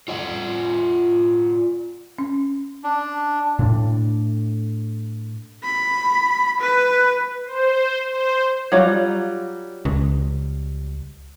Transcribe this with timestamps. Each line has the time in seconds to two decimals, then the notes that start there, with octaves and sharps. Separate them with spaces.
0.08 F4 D5 F#5
2.19 C#4
2.84 D4
3.59 A2 D4
5.63 B5
6.61 B4
7.45 C5
8.10 C5
8.72 F#3 G3 F4
9.85 C#2